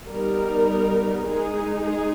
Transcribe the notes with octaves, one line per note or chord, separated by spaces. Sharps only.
G3 B3 D#4 A#4
G#3 D#4 G#4
G#4